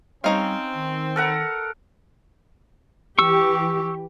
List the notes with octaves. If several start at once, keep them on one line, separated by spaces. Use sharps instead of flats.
G3 C4 C#4 D#4 F5
D#3
A4 A#4 F#5
E3 G4 C#6 E6